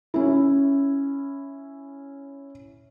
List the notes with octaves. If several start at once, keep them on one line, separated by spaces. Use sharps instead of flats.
C#4 E4